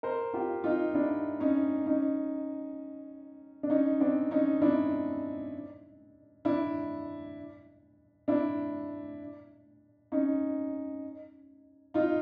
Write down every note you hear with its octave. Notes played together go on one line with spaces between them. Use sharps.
A#4 C5
F4 G4
D#4 F4
D4 E4
C#4 D#4
C#4 D#4
D4
C#4 D#4
C4 D4
C#4 D#4
D4 E4
D4 E4
D4 E4
C#4 D#4
D#4 F4